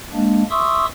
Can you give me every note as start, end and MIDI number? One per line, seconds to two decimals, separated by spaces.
0.13 0.43 56
0.13 0.43 58
0.13 0.43 62
0.50 0.86 76
0.50 0.86 84
0.50 0.86 85
0.50 0.86 87
0.50 0.86 88